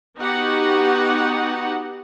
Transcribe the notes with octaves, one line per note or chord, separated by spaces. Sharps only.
B3 D#4 F#4 G4 F#5